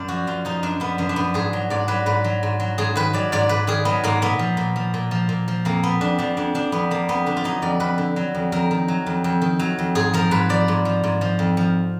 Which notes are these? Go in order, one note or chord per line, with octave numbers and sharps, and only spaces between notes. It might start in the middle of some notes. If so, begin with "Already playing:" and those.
Already playing: F#2 D5
F3 F#4
F#2 F4
F3 D#4
F#2 D4
F3 B3
F#2 B3
D4
F3 B3
G#2 G#4
F#3
G#2 D5
F#3 B4
G#2 B4
F#3
G#2
F#3
G#2 G#4
D#3 B4
F#3 D5
G#2 D5
G#2 B4
D#3 G#4
F#3 B3
G#2 A#3
A#2 B3
F3
A#2
F3
A#2
F3
A#2
F3
F2 A#3
F3 B3
F2 D4
F3 D4
F2 D4
F3 D4
F2 B3
F3 A#3
F2 B3
D3 D4
F4
F#3 D#4
F2 D5
F2 B4
D3
F#3
F2
F2 A#4
D#3
F#3
F2
F2
D#3
F#3
F2
G#2 G#4
F3 A#4
G#2 B4
F3 D5
G#2
F3
G#2
F3
F2
F3